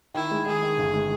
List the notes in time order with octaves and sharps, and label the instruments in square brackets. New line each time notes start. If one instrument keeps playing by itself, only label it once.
[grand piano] D#3 [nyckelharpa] E4
[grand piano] G#3
[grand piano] D#3 [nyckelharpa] G#4
[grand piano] D#3
G1
G#3